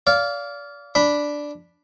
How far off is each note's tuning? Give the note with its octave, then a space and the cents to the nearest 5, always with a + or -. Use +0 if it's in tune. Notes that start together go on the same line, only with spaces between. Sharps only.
D5 -30 F5 +0
D4 +0 B5 +0